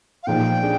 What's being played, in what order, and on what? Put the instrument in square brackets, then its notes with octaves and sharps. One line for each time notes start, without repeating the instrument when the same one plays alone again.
[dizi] F5
[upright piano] A#2 F3 G#3 D#4 [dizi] G5
[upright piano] D4 G#4